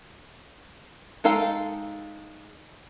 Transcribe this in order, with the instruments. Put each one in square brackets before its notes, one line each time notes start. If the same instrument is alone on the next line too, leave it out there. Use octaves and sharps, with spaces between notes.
[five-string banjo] G#3 D#4 A4 F5 G5